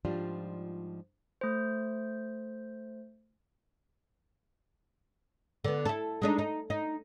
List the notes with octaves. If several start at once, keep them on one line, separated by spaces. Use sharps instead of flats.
G#2 F3 G3 D4 F4
A3 C5
D3 B3
E4 A4
G#3 D4 D#4
D#4
D#4